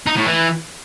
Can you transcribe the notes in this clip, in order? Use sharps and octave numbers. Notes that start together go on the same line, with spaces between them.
D#4
A2
E3